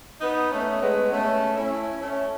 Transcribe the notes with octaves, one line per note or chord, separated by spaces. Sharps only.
B3 D#4
A3 C#4
G#3 B3
A3 C#4
C#4 E4
A3 C#4